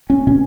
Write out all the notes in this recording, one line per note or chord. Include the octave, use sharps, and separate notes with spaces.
C#4
B2 C#4